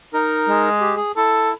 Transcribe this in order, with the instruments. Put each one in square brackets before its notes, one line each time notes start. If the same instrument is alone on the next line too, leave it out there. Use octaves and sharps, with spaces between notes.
[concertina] D#4 A#4
[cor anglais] G#3
[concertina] G4
G#4
[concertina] E4 [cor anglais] A4